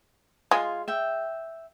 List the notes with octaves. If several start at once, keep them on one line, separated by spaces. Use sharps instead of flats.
G#3 F4 G#5
E5 G5